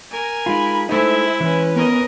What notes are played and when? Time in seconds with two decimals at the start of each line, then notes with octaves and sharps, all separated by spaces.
0.11 A#4 G#5
0.46 G#3 D#4 F4 B5
0.89 G#3 A3 D#4 E4 C5 E5
1.40 E3 C#4 B4
1.76 B3 A#4 D#5